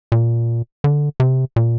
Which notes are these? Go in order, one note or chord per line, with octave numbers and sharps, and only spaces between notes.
A#2
D3
C3
A#2